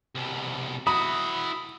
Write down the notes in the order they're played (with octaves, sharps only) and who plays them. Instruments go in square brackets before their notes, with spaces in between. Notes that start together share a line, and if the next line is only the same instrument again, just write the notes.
[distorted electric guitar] C2 B2
[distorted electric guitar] E4 F#4 [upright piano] B5 [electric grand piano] D#6